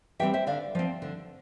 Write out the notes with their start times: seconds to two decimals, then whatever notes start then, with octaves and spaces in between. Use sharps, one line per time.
0.19 E3 G3 C4 E5 G5
0.33 C5 E5
0.47 D3 D5 F5
0.75 F3 C4
1.02 D3